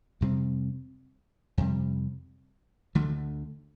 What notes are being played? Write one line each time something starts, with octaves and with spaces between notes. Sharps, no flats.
F2 C3 G3 C4
F2 C3 G3
D2 D3 A3